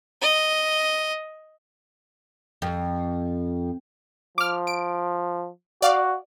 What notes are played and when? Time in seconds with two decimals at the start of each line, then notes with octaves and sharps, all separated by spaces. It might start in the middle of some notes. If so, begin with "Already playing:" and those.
0.21 D#5
2.62 F2
4.38 F3 D6 F6
4.67 D7
5.82 F#4 D5 F5